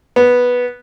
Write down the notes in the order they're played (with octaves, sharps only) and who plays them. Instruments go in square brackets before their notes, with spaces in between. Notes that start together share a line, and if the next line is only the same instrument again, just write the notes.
[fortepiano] B3